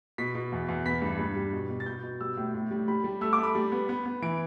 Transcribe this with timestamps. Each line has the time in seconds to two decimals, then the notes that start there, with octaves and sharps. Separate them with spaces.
0.18 B2 B6
0.35 B2
0.52 E2
0.68 E2
0.85 B3 B6
1.02 G2
1.19 G2
1.36 G3
1.53 B2
1.69 B2
1.80 A6
1.86 B2 G6
2.03 B2
2.21 G3 E6
2.37 A2
2.54 A2
2.71 G3
2.88 G3 B5
3.04 G3
3.21 A3 E6
3.33 D6
3.38 A3
3.43 B5
3.55 G3
3.72 B3
3.89 B3
4.06 B3
4.22 E3 D7